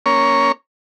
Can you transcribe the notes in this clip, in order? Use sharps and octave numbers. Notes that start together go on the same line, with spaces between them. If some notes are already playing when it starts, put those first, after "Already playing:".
A#3 C#4 C#5